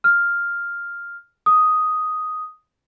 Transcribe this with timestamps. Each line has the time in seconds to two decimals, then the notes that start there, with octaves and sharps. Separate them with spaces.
0.04 F6
1.46 D#6